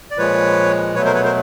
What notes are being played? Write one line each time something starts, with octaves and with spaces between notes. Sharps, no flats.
D5
A#2 F3 G#3 B4 C#5
B2 F#3 A3 B4 C#5
A#4 C5
B4 C#5
A#4 C5